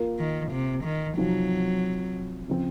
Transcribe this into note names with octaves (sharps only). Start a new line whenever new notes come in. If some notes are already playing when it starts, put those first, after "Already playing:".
Already playing: A#3 F4 A#4
D#3
C3
D#3
C3 F3 F#3 C4 D#4 F#4
C#3 F3 C4